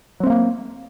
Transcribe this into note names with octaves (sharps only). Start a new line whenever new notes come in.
F#3 A3 A#3 C4